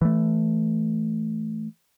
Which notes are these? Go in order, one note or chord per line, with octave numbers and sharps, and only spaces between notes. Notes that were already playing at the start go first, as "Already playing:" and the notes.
E3 A3